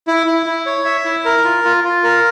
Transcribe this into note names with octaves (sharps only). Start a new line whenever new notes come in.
E4
E4
E4
C#5
E5
E4
A#4
F4
F4
F4
A#4